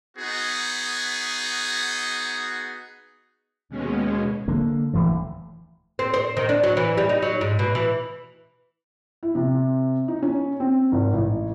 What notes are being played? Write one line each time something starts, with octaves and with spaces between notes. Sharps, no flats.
B3 D#4 F#4 G#4
D#2 B2 G#3 C#4
D3 A#3
D#1 D2 E3 A3
C4
C5
D#3
D4
F#3
E3
G3
D#4
F#3
G#2
B2
E3
E4
C3
D#4
C#4
C4
G#1
A1